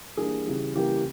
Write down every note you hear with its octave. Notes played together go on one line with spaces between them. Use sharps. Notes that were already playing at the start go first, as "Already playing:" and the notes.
E3 G3 A#3 D4 G#4
C#3 E3 G3
C#3 E3 G3 A#3 G4